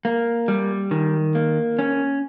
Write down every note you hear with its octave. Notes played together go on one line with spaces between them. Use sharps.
A#3
G3
D#3
A#3
C#4